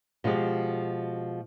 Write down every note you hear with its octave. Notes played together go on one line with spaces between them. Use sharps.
B2 F3 G#3 G4